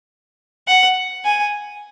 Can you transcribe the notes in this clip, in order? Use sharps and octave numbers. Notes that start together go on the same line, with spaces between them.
F#5
G#5